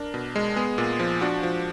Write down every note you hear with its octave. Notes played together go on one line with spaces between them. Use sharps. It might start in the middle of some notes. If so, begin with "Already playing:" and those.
Already playing: D4 A#4
B2
G#3
B3 G#4
A#2
F3
D4 F#4
F3